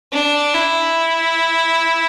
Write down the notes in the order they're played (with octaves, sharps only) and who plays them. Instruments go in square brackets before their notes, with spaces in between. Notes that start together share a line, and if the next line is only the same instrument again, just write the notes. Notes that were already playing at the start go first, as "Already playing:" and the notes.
[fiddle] D4
E4